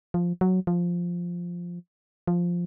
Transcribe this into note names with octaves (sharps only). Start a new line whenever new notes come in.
F3
F#3
F3
F3